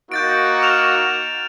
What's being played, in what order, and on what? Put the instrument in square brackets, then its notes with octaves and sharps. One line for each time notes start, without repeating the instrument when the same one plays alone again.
[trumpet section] A#3 D#4 F#4 [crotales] G6 A6 D7
[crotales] F6 E7 F7